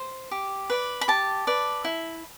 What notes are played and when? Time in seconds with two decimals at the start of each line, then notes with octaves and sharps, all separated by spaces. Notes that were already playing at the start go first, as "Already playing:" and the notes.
Already playing: C5
0.31 G4
0.70 B4 D5
1.01 B5
1.08 G4 A5
1.47 B4 D5
1.84 E4